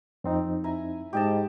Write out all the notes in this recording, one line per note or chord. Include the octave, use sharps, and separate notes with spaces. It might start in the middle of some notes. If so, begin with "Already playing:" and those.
F2 C4 D#4
E4 G#5 A#5
G#2 G4 D#5 A5